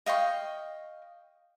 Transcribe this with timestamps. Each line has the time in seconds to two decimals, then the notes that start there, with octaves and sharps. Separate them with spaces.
0.06 D#5 F5 G5 C#6